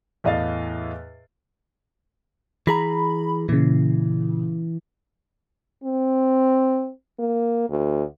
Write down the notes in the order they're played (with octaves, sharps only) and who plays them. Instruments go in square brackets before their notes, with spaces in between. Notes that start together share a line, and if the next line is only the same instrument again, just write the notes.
[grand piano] E2 A2 D#5 F5 A6
[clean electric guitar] E3 G#4 A#5 [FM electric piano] B5
[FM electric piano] A#2 C#3 [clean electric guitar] E3
[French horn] C4
A#3
D2